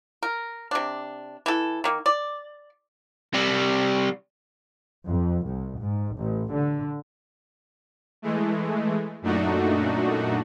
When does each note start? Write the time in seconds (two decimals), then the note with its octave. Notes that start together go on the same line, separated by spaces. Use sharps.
0.23 A#4
0.71 C3 D4
1.46 E3 A4
1.84 D#3 A#3
2.06 D5
3.34 C3 G3
5.07 F2
5.45 C2
5.80 G#2
6.17 A1
6.52 D3
8.22 E3 G#3 A3
9.22 F#2 A#2 A3 D4 D#4 F#4